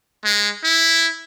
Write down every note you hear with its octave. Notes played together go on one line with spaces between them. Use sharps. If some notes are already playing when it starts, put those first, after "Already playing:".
G#3
E4